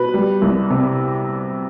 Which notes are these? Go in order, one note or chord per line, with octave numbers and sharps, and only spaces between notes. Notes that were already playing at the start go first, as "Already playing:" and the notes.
Already playing: B2 B4
G3
C2
C3